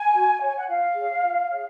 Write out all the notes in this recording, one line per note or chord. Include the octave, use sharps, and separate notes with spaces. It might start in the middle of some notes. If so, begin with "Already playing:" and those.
Already playing: G#5
F#4
C#5 G#5
F#5
F4 F5
G#4 C#5
F4
G#4 C#5